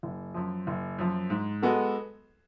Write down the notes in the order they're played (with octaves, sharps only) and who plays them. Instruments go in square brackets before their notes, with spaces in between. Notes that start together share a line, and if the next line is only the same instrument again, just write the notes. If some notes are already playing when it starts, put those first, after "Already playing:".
[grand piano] F#1
F#2 F3
F#1
F#2 F3
G#2
G#3 B3 F#4 A4